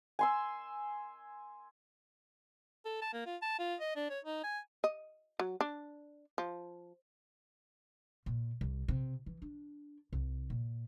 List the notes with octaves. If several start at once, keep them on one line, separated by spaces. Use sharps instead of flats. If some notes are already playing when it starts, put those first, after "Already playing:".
G#5 C6 E6
A4
A5
A#3
F4
A5
F4
D#5
D4
C#5
D#4
G#5
D#5
F#3
D4
F3
A#2
C2
C3
E3
D4
C2
A#2